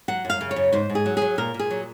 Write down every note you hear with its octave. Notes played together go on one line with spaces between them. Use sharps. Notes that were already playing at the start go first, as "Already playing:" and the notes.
F#3 F#5
F#2 F5
C#3
C#5
F#2
G#2 C5
G#2
G#4
F#3
F#3 G#4
A#2 A#4
A#2
G#4
F#3